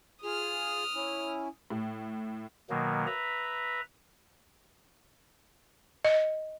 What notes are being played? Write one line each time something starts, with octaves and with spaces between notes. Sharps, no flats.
F4 G#4 D#6 F6
C#4 E4
A2
B2 D#3 F#3 A#3
B4 E5 A#5
D#5